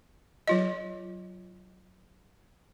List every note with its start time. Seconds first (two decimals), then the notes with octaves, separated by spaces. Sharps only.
0.48 F#3 F4 D#5